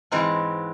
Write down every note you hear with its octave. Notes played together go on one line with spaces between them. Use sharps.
G#2 E3 G#3 C4